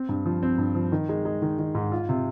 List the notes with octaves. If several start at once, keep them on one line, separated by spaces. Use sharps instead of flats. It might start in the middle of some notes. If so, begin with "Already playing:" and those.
Already playing: C4
G2
F3
C4
G2
F3
D#3
G#3
G#3
D#3
D#3
G#2
F4
C3